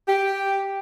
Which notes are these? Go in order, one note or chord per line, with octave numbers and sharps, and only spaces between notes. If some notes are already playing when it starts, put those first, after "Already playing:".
G4